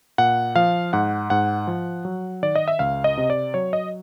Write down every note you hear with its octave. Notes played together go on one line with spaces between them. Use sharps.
A#2 F#5
F3 F5
G#2 F#5
G#2 F#5
F3
F#3
D#3 D5
D#5
E5
C#2 F5
D#5
C3
D5
F#3 C#5
D#5